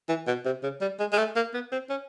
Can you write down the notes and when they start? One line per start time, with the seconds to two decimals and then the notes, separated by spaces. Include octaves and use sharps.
0.09 E3
0.27 B2
0.45 C3
0.63 C#3
0.81 G3
0.99 G#3
1.13 G#3
1.18 A3
1.36 A#3
1.54 B3
1.72 C4
1.90 C#4